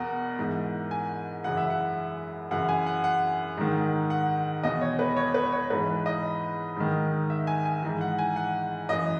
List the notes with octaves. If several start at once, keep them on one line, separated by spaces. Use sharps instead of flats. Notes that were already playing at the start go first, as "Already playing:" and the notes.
Already playing: E2 B2 A#4 F#5
G#2 E3
G#5
F#2 C#3 E3 F#5
E5
F#5
F#2 C#3 E3 F#5
G#5
F#5
F#5
G#2 D#3
F#5
E2 B2 D#5
C#5
B4
C#5
B4
C#5
G#2 E3 B4
D#5
G#2 D#3
E5
G#5
G#5
G#2 E3
F#5
G#5
F#5
F#2 E3 D#5